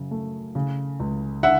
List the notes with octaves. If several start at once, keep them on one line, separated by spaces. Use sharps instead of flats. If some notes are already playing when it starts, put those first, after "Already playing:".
Already playing: F#2 C#3
A3
C#3
C#2
D3 E5 F#5